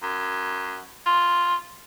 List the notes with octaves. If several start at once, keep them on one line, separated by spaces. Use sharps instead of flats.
F#2
F4